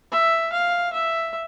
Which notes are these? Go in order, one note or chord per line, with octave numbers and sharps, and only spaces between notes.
E5
F5
E5